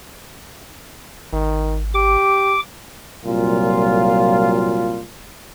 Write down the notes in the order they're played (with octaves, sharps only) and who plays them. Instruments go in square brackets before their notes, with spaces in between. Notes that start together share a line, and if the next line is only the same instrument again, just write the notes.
[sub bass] G#1 [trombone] D#3
[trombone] G4 [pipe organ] D6
[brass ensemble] C2 A#2 F#3 F4